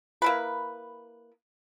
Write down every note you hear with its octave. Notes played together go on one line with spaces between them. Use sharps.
A#3 E4 B4